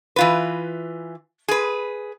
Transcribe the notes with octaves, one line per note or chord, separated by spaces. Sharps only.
E3 F4 B4
G#4 B4